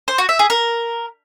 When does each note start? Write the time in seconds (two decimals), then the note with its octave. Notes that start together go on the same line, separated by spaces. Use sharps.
0.08 C5
0.18 F#4
0.29 E5
0.39 G#4
0.50 A#4